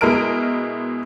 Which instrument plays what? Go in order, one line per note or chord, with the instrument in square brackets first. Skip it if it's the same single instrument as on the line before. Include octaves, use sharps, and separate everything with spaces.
[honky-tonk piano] B2 G#3 E4 A#4 F6 D7